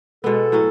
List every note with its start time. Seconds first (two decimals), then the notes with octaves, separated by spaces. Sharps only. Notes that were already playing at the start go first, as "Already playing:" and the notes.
0.24 B2 G#3 B3 A4
0.52 A2 F#3 C#4